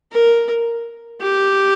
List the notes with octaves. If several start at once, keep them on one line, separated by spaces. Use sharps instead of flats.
A#4
G4